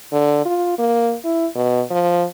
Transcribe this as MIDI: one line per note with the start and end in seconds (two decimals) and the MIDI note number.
0.12 0.43 50
0.45 0.77 65
0.78 1.15 58
1.24 1.47 64
1.55 1.82 47
1.91 2.25 53